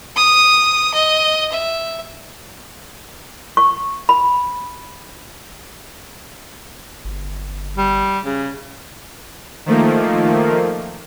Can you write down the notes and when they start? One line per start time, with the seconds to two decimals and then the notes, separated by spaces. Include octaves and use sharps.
0.16 D#6
0.94 D#5
1.52 E5
3.57 C#6
4.09 B5
7.05 G1
7.77 G3
8.25 C#3
9.66 D#3 F3 A3 A#3